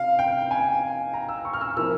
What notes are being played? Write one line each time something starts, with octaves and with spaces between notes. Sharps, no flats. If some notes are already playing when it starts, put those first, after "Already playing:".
Already playing: C3 F5
G5
G#5
A#5
E6
C#6
F6
E6
C3 F3 A#3 E4 E6